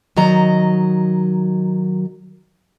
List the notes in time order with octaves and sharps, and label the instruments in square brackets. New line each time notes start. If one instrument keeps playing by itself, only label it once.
[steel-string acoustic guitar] D#3 F#3 D#5 A#5